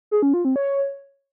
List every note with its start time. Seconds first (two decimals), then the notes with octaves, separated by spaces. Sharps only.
0.11 G#4
0.22 C#4
0.34 F4
0.45 C4
0.56 C#5